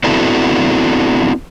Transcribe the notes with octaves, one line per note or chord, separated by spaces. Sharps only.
B3 C4 D4 E4 F#4 A4